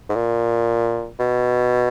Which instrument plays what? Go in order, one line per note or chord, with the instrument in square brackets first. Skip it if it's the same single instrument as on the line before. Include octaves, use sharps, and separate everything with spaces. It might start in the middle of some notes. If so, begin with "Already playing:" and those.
[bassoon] G#2
A#2
B2